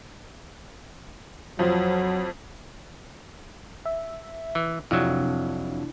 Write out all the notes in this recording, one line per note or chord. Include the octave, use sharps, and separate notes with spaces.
F2 F3 F#3
E5
E3
F2 C3 F#3 D4 E4